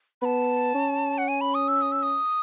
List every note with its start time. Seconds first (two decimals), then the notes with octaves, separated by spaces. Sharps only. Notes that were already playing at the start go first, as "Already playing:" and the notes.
0.22 B3 A5 B5
0.75 C#4
1.18 F#5
1.28 G#5
1.41 B5
1.54 D#6
1.68 E6
1.82 D#6
1.92 E6
2.02 D#6